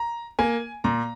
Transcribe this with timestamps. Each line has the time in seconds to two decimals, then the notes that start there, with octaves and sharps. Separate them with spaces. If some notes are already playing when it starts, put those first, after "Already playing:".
Already playing: A#5
0.39 A#3 G#5
0.84 A#2 A#5